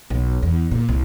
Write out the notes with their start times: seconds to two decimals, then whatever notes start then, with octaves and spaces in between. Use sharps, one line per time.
0.10 B1
0.43 E2
0.71 A#2
0.89 C2